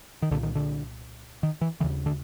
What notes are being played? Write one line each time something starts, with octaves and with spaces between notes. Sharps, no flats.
D#3
C2 A#2 D3
D#3
D3
D#3
E3
D#2 C#3 E3
D3